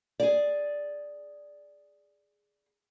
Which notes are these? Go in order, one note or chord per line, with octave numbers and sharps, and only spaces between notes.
G#4 D5